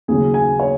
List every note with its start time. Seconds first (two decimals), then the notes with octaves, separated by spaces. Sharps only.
0.08 D#2 C#3 F#3 G#4
0.34 G#5
0.59 C#5